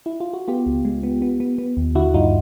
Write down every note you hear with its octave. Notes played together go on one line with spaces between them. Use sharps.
E4
F4
F#4
B3 F4 G4
C#2
G#3
B3
B3
B3
B3
D#2
D3 E4 F#4
G2 D#4 F4